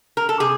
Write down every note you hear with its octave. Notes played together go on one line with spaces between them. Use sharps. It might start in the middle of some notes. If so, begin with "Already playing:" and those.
A#4
A4
C3 G#4